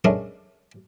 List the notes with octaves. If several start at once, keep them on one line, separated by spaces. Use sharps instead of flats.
G#3 A3 C#4 D4 A#4